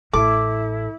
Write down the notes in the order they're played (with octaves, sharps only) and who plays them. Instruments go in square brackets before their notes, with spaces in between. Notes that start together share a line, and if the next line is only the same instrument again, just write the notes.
[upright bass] A1 [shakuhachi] E4 [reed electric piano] A4 [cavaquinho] D6